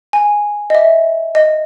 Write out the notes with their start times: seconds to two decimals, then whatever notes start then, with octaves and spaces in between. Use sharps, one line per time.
0.13 G#5
0.70 D#5
0.75 E5
1.35 D#5